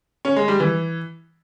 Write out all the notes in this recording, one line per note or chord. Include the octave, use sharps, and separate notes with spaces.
C#4
G#3
G3
E3